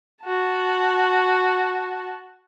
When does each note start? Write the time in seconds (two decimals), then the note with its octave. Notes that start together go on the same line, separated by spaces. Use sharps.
0.24 F#4 A5